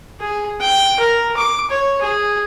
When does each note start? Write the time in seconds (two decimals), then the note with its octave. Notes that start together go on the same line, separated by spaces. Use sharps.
0.20 G#4
0.60 G5
0.99 A#4
1.36 D6
1.70 C#5
2.01 G#4